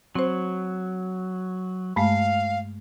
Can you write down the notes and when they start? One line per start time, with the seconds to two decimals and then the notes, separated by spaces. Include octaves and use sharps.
0.15 F#3 C4 C5
1.96 G2 G#3 A3 F5